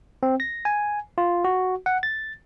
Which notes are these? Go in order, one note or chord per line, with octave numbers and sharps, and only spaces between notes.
C4
A#6
G#5
F4
F#4
F#5
A6